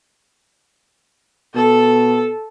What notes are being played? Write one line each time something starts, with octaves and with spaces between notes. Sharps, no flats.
B2 A4